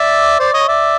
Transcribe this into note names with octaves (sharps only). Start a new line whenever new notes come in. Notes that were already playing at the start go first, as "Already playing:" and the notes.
Already playing: D5 E5
C5 D5
C#5 D#5
D5 E5